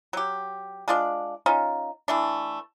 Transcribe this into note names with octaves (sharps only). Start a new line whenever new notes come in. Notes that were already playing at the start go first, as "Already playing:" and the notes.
F#3 G4
G#3 D4 F4 D5
C#4 D#4 F4
E3 A3 D4